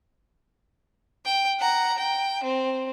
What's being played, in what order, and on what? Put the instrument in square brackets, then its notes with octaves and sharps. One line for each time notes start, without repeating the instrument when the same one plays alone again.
[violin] G5
F#5 A#5
G5
C4